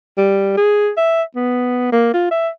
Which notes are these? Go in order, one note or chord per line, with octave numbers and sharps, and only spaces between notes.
G3
G#4
E5
B3
A#3
F4
E5